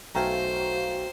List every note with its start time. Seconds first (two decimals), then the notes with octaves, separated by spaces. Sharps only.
0.15 B1 A3 F#4 C5 F5 G5 G#5 A#5